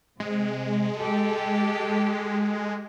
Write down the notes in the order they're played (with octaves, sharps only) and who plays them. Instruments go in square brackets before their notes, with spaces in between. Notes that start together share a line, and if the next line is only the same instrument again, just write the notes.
[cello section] C3 [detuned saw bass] G#3
[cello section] G4 A4